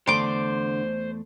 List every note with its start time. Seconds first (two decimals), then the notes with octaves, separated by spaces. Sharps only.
0.07 E2 D3 A3 C5 D5 C6 D6